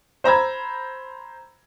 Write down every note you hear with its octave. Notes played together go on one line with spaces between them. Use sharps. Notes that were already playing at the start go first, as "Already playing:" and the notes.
C5 A#5 B5 E6 G#6